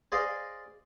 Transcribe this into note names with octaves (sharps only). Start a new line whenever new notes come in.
G#4 C5 D5 D#5 F5